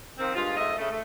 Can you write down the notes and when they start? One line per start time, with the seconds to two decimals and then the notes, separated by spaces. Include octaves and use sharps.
0.19 D#3 F3 C4
0.35 G2 G#3 F4
0.57 G#2 C3 A3 D#5 E5
0.78 C#3 A3
0.91 A3